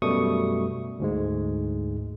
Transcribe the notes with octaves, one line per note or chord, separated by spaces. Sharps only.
F#2 B2 G3 A3 C#6 D#6
D2 G#2 G#3